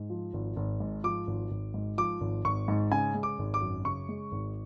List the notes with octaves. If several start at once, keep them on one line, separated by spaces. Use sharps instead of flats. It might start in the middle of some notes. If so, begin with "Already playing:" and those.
Already playing: G#2
F3
G#1
G#1
G#2
F3 D6
G#1
G#1
G#2
F3 D6
G#1
G#1 C#6
G#2
C#3 G#5
G#3
D6
G#1
D6
F#2
C#3 C#6
G#3
G#1